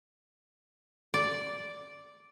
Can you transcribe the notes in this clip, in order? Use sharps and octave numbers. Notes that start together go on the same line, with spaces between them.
D5